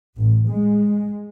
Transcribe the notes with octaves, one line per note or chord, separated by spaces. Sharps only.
A1
G#3